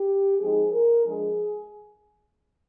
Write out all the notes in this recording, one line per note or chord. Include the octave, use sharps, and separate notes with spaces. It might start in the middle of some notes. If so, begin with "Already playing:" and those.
Already playing: G4
F3 G#3 C4 D#4 G#4
A#4
F3 G#3 D4 G#4